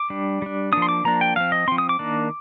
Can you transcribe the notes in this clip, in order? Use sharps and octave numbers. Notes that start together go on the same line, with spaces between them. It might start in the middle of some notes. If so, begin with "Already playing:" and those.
Already playing: D6
G3 D4
G3 D4
F3 A#3 D4 D#6
C6
D6
F3 A#3 D4 A#5
G5
F3 C4 F5
D#5
F3 C4 C6
D#6
D6
D#3 A#3 D4